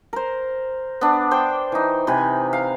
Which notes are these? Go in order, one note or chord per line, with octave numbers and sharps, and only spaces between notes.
A#4 C5
B3 D4
C5 G5 D6
E3 D#4
C3 B4 G#5
F5